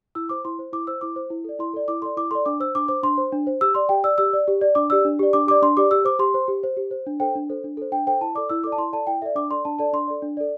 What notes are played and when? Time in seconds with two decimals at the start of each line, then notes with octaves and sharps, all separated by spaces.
0.15 E4 E6
0.29 C5 D6
0.45 E4 C6
0.59 C5
0.73 E4 D6
0.87 C5 E6
1.01 E4 D6
1.16 C5
1.30 E4
1.44 A4 D5
1.59 E4 C6
1.73 A4 D5
1.88 E4 D6
2.02 A4 D5 C6
2.17 E4 D6
2.31 A4 D5 C6
2.46 D4 D6
2.60 C5 E6
2.75 D4 D6
2.88 C5 D6
3.03 D4 C6
3.18 C5
3.32 D4
3.47 C5
3.61 G4 E6
3.75 D5 C6
3.89 G4 G5
4.04 D5 E6
4.18 G4 E6
4.33 D5
4.48 G4
4.61 D5
4.75 D4 D6
4.90 G4 D5 E6
5.05 D4
5.19 G4 D5
5.33 D4 D6
5.47 G4 D6
5.51 D5
5.62 D4 C6
5.77 G4 D5 D6
5.91 G4 E6
6.05 C5 D6
6.19 G4 C6
6.34 C5
6.48 G4
6.63 C5
6.77 G4
6.91 C5
7.07 D4
7.20 A4 C5 G5
7.35 D4
7.49 A4 C5
7.64 D4
7.77 A4 C5
7.92 D4 G5
8.07 A4 C5 G5
8.21 E4 A5
8.35 A4 D5 D6
8.49 E4 E6
8.64 A4 D5 D6
8.72 A5
8.78 E4 C6
8.93 A4 D5 A5
9.07 E4 G5
9.22 A4 D5 E5
9.35 D4 D6
9.50 A4 D5 C6
9.65 D4 A5
9.79 A4 D5 A5
9.93 D4 C6
10.08 A4 D5
10.22 D4
10.37 A4 D5